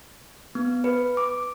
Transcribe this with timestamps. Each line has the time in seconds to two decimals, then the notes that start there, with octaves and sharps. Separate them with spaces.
0.55 B3
0.84 B4
1.17 D6